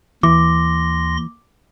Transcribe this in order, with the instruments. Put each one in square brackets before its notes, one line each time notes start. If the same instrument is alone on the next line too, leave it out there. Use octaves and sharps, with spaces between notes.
[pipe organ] D#2 C6 A#6 [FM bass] E3 [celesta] D6